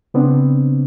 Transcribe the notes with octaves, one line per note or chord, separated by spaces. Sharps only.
C#3 B3 C4 D4